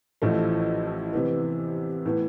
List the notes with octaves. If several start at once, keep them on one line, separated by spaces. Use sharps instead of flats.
A1 A2 F3 A3
C3 E3 B3
A2 E3 B3